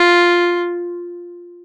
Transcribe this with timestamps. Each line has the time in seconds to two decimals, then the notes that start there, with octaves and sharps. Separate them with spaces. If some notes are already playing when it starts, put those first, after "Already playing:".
Already playing: F4